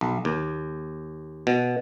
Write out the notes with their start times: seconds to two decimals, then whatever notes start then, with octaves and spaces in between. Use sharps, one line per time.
0.01 B1
0.25 D#2
1.47 B2